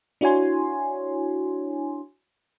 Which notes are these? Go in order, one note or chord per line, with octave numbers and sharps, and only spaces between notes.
D4 E4 F#4 C#5 G#5 C6